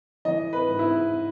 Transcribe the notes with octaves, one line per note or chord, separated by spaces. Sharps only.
E3 D#5
B4
G#2
E4